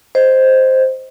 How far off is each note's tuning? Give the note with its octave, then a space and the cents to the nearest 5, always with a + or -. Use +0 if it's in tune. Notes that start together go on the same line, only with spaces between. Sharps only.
C5 +0 D#5 +0